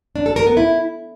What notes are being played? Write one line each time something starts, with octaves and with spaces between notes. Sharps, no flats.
D4
A4
A#4
B3
E4